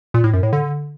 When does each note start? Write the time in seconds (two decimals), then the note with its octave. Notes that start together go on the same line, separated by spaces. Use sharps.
0.14 A#2
0.24 A2
0.33 F#2
0.43 A2
0.53 D3